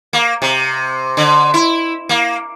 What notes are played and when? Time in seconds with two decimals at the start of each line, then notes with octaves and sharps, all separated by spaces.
0.13 A#3
0.42 C3
1.17 D3
1.54 E4
2.09 A#3